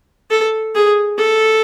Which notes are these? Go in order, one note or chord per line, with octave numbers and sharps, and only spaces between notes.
A4
G#4
A4